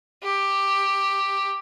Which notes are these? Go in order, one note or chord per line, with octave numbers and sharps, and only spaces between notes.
G4